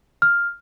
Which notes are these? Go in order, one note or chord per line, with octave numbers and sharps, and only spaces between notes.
F6